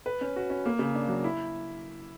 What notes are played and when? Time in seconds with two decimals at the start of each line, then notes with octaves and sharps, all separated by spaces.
0.06 B4
0.21 C#4
0.36 F#4
0.50 C#4
0.66 A#3
0.79 C#3
0.95 D4
1.09 F#3
1.24 E4